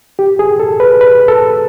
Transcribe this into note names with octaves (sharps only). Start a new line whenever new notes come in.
G4
G#4
A4
B4
B4
A4